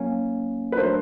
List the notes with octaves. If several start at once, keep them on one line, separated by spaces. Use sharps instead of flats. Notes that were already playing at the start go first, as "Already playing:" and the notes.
Already playing: F#3 A#3 C#4
B4
F#3 A3 D4 A#4 C5